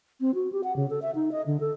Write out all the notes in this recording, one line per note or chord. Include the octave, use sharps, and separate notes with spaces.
C4
F#4
G4
F#5
C#3
A4
E5
D#4
D#5
D3
A4